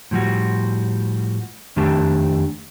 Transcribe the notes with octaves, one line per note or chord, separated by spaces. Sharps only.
A2 F3 G3 F#4
F2 D#3 A3 D4 G4 A5